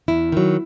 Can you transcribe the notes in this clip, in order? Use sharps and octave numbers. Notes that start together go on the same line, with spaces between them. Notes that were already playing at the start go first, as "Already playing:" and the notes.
E2 E4
D#3 F#3